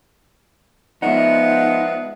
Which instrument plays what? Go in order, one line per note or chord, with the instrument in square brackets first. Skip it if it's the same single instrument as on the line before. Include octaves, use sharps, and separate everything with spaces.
[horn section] F3 G#3 B3 [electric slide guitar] D#4 [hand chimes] D5 E5 [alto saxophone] F#5